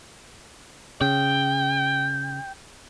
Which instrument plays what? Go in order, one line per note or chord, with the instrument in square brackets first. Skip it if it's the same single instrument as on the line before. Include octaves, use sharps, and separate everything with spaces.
[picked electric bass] C#3 [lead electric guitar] G5